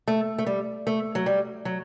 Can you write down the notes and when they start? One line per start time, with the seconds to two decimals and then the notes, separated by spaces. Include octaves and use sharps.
0.08 A3
0.38 A3
0.46 G3
0.87 A3
1.15 F#3
1.26 G3
1.65 F#3